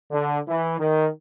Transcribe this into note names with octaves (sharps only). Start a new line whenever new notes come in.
D3
E3
D#3